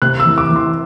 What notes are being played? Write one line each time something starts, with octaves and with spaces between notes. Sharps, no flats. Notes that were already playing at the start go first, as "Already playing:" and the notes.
C3 F#6
E6
E3
D6
E3
C6